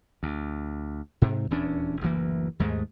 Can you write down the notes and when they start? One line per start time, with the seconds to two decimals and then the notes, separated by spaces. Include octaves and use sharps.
0.23 D2
1.22 G#2 C3
1.50 D#1 E2 C#4 D4
2.01 F#1 D2 E3 A#3
2.59 D#2 G#2 G#3 A3